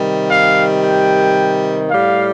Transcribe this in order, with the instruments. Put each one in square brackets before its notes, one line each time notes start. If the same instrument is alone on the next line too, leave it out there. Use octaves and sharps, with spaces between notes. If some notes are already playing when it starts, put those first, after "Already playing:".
Already playing: [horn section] C3 D#3 G3
F5
G5
A2 G3 F5